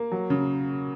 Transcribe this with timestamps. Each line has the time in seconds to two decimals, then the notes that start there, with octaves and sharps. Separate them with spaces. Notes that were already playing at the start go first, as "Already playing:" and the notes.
Already playing: A#3
0.12 F#3
0.30 C#3